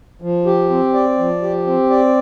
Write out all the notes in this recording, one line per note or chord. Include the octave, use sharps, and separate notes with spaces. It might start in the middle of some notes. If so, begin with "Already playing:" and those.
F3
G4
C4
D5
F3
G4
C4
D5